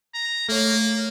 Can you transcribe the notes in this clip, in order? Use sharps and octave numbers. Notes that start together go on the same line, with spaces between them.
A#5
A3 A#3 C#5